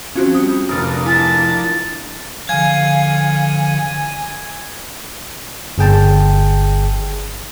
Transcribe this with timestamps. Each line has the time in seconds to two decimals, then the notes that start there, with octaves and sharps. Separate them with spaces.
0.15 F3 C4 C#4 F#4
0.34 G3 D#6
0.69 F1 F3 D4 A#4 D#6 F6 A6
1.06 E4 G#5 A5
2.49 D3 F3 F5 G#5 G#6
5.78 G1 G#4 G5 A5